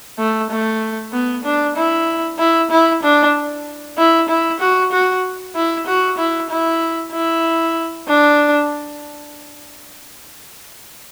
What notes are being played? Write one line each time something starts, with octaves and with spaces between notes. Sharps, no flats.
A3
A3
B3
D4
E4
E4
E4
D4
E4
E4
F#4
F#4
E4
F#4
E4
E4
E4
D4